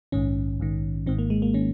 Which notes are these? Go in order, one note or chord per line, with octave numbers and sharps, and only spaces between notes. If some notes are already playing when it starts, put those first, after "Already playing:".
A#1 G#2 D#3 C#4
A#1 G#2 D#3
G#1 G#2 D#3 C4
A#3
G#3
A#3
D#3 C#4